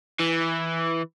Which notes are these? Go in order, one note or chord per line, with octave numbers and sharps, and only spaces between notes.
E3